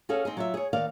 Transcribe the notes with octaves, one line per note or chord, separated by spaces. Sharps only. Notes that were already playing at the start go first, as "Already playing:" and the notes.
C#4 F#4 G#4 A4 F5
C4 D#4 G#4
F#3 F4 E5
G#4 C#5
D#2 D#3 A#4 D5 F5